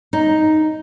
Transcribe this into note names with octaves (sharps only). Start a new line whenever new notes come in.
D#4